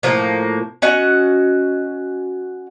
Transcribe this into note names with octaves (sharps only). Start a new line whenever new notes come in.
A2 F3 A#3
C#4 F#4 D#5 F#5